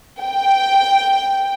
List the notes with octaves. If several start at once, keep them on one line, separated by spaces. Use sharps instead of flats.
G5